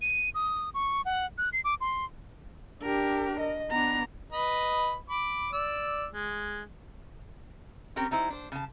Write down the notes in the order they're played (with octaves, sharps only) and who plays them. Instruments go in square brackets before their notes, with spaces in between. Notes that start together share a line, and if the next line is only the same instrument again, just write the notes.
[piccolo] D#7
D#6
C#6
F#5
F#6
C7
D6
C6
[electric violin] D4 G4 [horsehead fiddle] A#4
[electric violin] D#5
[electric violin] B3 [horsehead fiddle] D4 A#5
[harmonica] B4 D#5 B5
B5 D6
D5 E6
G#3
[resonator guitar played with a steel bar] C4 C#4 G4 A#4
G3 D#4 E4 C5
D4 C5
C#3 A5